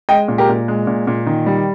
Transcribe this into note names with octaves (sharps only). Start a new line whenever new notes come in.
G#3 D#5 G5
A#2
G4 A#4
A#2
G#3
A#2
A#2
D#3
G3